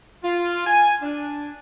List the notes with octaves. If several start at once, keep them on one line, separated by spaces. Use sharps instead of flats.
F4
G#5
D4